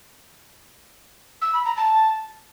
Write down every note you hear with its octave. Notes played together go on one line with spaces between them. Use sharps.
E6
B5
A#5
A5